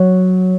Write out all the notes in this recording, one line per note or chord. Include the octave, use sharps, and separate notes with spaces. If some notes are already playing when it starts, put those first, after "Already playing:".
Already playing: F#3